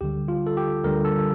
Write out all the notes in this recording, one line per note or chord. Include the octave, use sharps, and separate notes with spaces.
D2 D3 G3 G4
F4
A4
G4
D2 D3 G3 A#4
A4